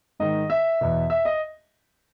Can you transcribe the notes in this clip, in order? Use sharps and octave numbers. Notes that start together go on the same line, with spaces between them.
G#2 D#3 D#5
E5
E2 B2
E5
D#5